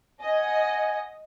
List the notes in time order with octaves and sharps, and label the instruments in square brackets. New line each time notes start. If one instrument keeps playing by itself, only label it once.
[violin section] D#5 [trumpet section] F#5 G#5